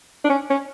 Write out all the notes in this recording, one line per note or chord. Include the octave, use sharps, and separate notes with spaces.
D4
C#4
C#4